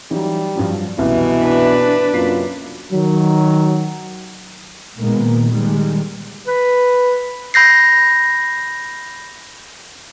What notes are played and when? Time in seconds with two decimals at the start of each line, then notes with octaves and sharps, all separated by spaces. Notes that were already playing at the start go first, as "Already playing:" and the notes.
0.11 E3 F#3 G3 D#4
0.56 G2 F3 F#3
0.99 C2 F#2 B2 E3
1.42 D4 B4
2.14 F#2 C3 A#3 F4 C7
2.93 D#3 F#3
4.99 A#2 D#3 G#3 A#3 B3
5.50 D#3 G3 G#3
6.47 B4
7.54 B5 G6 A#6 C7